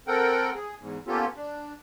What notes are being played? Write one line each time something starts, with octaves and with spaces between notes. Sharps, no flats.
C4 A4 A#4 F#5 G5
G#4
E2 G#2
A#3 B3 C#4 F4 G4 A4
D4